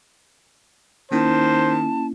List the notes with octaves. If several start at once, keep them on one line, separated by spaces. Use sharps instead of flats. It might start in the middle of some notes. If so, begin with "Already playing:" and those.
D#3 A#3 C#4 E4 C5 A5